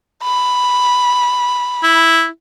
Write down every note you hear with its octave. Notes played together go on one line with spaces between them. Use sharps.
B5
E4